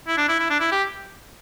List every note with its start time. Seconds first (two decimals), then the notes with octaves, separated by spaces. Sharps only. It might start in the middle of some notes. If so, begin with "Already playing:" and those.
0.08 E4
0.18 D4
0.29 E4
0.39 E4
0.50 D4
0.60 E4
0.72 G4